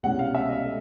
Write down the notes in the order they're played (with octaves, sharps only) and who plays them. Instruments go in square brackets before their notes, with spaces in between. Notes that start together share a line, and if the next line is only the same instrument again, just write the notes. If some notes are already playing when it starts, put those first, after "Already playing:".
[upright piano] C2 B2 G#3 C#4 F#5
F5
E5
D#5
A3